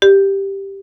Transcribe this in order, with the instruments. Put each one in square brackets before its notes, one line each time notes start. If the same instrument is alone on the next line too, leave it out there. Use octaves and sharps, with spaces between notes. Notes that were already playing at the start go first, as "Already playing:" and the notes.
[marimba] G4